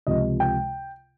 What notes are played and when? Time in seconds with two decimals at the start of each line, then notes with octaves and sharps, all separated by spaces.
0.07 C#2 C3 F3 D#5
0.40 G5